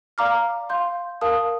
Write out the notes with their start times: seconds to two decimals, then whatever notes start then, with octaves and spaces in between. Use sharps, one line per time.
0.18 D5 F5 A#5 D6 F6
0.69 F5 C6 G6
1.21 A#4 F5 A5 D#6